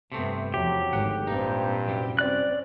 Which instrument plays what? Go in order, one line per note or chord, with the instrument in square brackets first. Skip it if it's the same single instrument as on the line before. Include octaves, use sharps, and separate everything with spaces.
[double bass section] G2 B3 [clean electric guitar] C3 A3 C4
[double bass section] E2 F3 [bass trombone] F#3 [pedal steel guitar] G4
[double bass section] G#1 [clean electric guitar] D2 F#5
[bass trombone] G2 [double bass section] A#2 C4 [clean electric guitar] D#4
[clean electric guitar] C2 F#2 G3
[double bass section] C4 C#4 [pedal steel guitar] D5 F#6